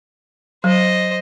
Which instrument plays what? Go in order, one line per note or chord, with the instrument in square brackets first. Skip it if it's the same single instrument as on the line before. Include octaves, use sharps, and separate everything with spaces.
[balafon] F#3 [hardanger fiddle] C5 D#5